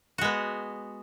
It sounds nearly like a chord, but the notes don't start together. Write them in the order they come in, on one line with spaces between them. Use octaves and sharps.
F#4 G#3 B3